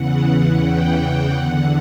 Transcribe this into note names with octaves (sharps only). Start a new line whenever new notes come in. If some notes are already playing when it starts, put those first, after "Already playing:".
Already playing: E2 C#3 E3 F#5
G5
E2 D3 F#5